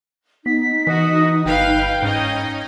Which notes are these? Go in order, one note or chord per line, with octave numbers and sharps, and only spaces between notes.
B3 D#4 B6
E3 F#4 D#5
G1 B4 F5 G5
G#2 C#4 D#4 D#5